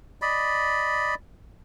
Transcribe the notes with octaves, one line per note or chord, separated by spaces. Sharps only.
D5 D#5 B5